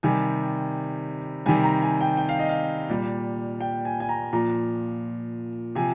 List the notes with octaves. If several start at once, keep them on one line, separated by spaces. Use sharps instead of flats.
C3 D#3 G3 G#5
C3 D#3 G3 G#5
A#5
G#5
G5
G5
F5
D#5
F5
A#2 G3
G5
G#5
G#5
A#5
A#2 F3 A#5
C3 F3 G#5